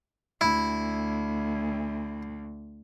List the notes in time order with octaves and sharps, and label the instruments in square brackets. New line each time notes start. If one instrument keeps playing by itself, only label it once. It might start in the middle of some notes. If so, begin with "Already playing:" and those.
[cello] D2 [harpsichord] E4